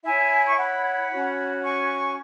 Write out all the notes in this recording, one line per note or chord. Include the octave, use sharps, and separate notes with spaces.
E4 C#5 E5 G#5
C#6
F#5 B5
C#4 F#4 C#5
G#5 C#6